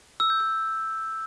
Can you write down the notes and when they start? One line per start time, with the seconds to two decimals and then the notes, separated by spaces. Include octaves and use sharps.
0.20 E6
0.30 G6
0.40 E6